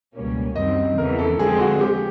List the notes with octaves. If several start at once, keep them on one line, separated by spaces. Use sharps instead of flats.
C#2 B2 G3 A#3 C#4
F#2 D#3 G3 C4 D#5
E2 C#3 E3 A#4
A4
F2 D3 F3 G#3 C4 G#4
F#4
G4